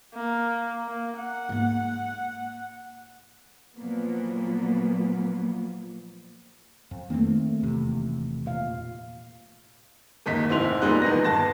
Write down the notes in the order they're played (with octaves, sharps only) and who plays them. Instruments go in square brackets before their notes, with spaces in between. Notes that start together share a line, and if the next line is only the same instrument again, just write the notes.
[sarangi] A#3
A#3
F#5
[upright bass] G#2 A#3
[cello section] A#2 F3 F#3 A#3 B3
[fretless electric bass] F2
[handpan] D#3 A3 [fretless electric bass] A#3 C4
[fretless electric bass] E1 E2 C3
[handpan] A#2 F5
[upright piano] F#1 D#2 D#5 B6
F1 G#2 C4 E4 C6 F7
E1 A#2 G3 G#3 D#4 F#6
E2 D#3 B3 A#6
G1 A5 A#6